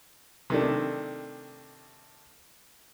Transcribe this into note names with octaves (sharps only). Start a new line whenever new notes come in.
C3 D#3 A3 D4